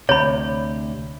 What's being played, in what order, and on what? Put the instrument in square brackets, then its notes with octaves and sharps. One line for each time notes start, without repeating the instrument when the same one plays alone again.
[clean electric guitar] D2 C3 [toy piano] C#5 B5